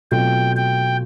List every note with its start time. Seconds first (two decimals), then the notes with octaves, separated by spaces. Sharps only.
0.11 B2 F#3 A3 C4 F4 G5
0.56 G5